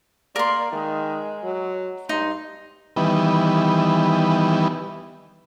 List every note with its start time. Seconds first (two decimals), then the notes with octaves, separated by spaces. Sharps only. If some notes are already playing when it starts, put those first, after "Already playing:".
0.36 A#3 A#4 D5 C6
0.73 D#3 G#3
1.44 F#3
2.09 G2 D#4 C6
2.96 D#3 E3 G3 B3